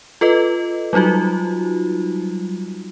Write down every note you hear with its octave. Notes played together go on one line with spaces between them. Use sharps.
F4 A4 B4 D#5
F#3 G3 D#4 F4 F#4